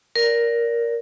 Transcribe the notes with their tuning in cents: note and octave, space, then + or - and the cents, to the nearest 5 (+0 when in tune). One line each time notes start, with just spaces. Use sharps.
A#4 +5 D5 -20